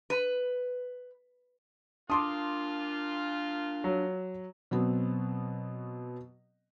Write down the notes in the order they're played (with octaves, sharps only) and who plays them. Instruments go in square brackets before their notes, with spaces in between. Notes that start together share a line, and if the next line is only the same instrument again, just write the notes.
[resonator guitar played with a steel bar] B4
[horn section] A#2 F4 [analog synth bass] D4 [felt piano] A5 C6 D6 [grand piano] D#6
[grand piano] F#3
[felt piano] B2 F#3 B3 C4